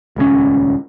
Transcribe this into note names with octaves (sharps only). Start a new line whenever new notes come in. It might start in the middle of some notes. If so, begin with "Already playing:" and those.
D#1 C#2 C3 C#4